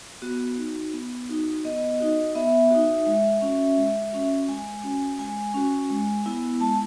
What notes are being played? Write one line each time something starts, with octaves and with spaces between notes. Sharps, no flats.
B3 F#4
D#4 F#4
B3
D#4 F#4
B3 D#5
D#4 F#4
B3 E5
D#4 F#4
G#3
C#4 F#4
G#3
C#4 F#4
G#3 G#5
C#4 F#4
G#3 G#5
C#4 F#4
G#3
B3 E4
G#3 A5